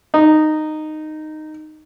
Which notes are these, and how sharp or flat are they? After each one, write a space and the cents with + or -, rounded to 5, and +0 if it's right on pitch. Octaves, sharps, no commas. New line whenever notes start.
D#4 -10